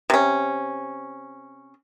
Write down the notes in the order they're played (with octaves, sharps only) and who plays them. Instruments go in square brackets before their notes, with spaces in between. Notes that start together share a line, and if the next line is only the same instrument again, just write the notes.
[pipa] C3 C#4